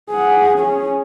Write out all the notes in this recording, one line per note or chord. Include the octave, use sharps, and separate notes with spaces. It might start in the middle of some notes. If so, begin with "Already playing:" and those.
G#4 F#5
C#4 G#4